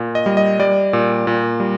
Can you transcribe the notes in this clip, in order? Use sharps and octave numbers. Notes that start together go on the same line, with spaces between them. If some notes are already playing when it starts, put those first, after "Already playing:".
Already playing: A#2
D#5
G3
D#5
G3 D5
A#2
A#2
G3